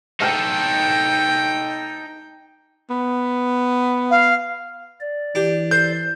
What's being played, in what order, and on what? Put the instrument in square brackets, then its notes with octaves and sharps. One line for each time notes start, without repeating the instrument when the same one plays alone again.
[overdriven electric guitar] D#4 A4 [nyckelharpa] G5
[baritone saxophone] B3
[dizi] F5
[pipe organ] D5
[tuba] E3 [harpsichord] D4 G4
[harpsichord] A4 C5 [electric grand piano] G6